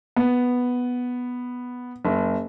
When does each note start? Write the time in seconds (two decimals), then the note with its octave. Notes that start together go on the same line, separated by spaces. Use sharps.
0.16 B3
2.05 F#1